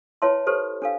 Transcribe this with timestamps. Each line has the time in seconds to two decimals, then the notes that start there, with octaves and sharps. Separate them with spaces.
0.22 E4 B4 C#5 E5 A5 C6
0.47 G4 A4 B4 C5
0.82 D4 A4 F5